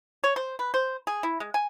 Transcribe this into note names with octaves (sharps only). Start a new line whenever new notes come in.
C#5
C5
B4
C5
G#4
E4
G#3
G#5